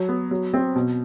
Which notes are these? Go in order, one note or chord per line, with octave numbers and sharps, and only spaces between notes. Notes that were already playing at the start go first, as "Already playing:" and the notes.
Already playing: F#3
B3
F#3
C4
B2